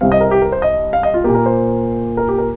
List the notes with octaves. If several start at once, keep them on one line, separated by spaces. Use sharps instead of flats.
C2 C3 G3 C4 F5
D#5
A#4
G4
A#4
C5
D#5
F5
D#5
F4
A#2 A#3 G4
A#4
C5
A#4
G4
A#4